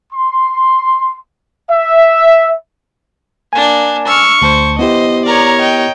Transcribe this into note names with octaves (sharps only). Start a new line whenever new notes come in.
C6
E5
A#3 D4 G#5
C#6 E6 F6
D2 C5 A5
B3 E4 G4 C5 D#5
A#4 C#5 D5 A#5
D#5 G5